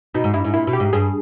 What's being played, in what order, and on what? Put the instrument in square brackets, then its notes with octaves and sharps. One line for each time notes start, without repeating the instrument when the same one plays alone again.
[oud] B2 [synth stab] D#4
[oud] G#2
[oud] G2 [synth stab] E4
[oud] G#2
[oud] A#2 [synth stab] E4
[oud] B2
[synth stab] G4
[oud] G#2
[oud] G2 [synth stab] G#4